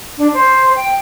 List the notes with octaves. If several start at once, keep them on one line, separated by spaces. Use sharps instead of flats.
D4
C5
G5